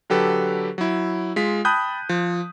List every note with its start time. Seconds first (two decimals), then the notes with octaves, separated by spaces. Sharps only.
0.10 D3 F#3 G4 A4 B4
0.78 F#3 E4
1.36 G#3 F4 B6
1.65 G5 A5 B5 D#6 F#6 G6
2.09 F3